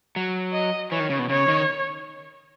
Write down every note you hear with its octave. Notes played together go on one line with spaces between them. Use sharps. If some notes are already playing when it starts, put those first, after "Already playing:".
F#3
D#5
E3 C#5
D#3
C#3
B2
C#3 C#5
D#3